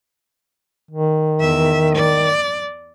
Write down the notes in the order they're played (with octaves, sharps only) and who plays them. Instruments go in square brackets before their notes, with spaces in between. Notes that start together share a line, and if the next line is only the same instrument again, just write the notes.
[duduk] D#3
[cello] E2 E5
D5